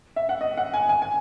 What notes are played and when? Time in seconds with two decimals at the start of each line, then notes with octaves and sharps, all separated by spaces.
0.16 E5
0.29 F#5
0.41 D#5
0.57 F#5
0.74 G#5
0.89 G#5
1.02 G#5